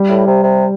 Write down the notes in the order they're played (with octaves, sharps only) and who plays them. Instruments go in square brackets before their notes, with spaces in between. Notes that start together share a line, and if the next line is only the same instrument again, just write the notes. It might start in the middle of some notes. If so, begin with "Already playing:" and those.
Already playing: [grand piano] G3
[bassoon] A2
C3
C3